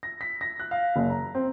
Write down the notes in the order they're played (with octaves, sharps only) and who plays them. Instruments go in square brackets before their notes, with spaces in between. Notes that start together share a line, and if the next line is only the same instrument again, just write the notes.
[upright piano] A#6
B6
A#6
F#6
F5
F#1
A#5
C4